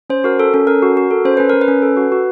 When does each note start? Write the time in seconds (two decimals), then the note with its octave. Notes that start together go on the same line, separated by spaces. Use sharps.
0.10 C#4 C5
0.24 F#4 A#4
0.40 A4
0.54 C#4 A4
0.67 C#4 A#4
0.82 F#4
0.97 F#4
1.11 A4
1.25 C#4 C5
1.37 C#4 B4
1.50 C#4 A#4
1.61 B4
1.68 C#4
1.82 A4
1.97 F#4
2.12 F#4